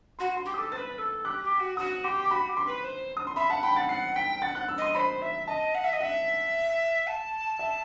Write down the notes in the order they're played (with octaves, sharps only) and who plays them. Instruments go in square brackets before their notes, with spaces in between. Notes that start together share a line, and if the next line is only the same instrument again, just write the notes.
[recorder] F#4 [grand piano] C6
[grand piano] C6
[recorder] G4
[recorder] A4 [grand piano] D#6
[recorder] C5 [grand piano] A6
[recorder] B4
A4
[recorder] G4 [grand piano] F#6
[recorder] G4
F#4
[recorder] F#4 [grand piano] D#6
[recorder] G4 [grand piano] C6
[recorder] F#4 [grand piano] B5
[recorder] G4
[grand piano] C6
[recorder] B4
C5
[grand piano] D#6
C6
[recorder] E5 [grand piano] B5
[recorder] F#5 [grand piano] A5
[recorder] G5 [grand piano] B5
[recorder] F#5 [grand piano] A6
[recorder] F#5 [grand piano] C7
[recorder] G5 [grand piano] B6
[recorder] F#5 [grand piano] A6
[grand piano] F#6
E6
[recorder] D#5 [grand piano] C6
[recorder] C5 [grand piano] B5
[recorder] E5
[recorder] D#5 [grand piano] A5
[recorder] F#5
E5
D#5
[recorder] E5 [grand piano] F#5
[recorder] A5
[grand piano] E5